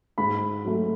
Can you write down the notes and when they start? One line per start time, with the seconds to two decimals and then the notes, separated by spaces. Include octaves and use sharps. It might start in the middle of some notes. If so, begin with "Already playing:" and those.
0.18 G#2 B5
0.65 F#3 A3